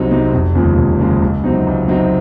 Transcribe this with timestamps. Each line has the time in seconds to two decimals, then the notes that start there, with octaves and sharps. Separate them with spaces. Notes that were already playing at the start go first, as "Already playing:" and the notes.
Already playing: C2 C3 F#3 C4 D#4
0.11 C3 F#3 C4 D#4
0.34 F1
0.55 D#2 C#3 F3 G#3
0.78 F1
0.99 D#2 C#3 F3 G#3
1.22 C#2
1.44 C3 F#3 C4 D#4
1.67 C#2
1.88 C3 F#3 C4 D#4